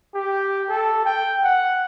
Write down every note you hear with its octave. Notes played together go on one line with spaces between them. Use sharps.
G4
A4
G5
F#5